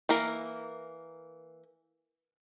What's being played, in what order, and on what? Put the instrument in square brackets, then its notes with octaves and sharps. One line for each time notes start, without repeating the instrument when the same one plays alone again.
[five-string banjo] E3 A#3 A#4